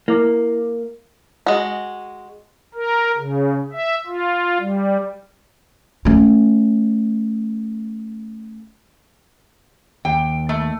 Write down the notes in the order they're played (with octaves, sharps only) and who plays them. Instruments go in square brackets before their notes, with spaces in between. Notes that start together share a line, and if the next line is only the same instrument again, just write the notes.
[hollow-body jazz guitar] A#3 [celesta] E4 D6
[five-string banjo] G#3 F#4
[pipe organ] A#4
C#3
E5
F4
G3
[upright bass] A3 C#4
[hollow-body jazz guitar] D#2 [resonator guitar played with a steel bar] G5
[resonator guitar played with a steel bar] A3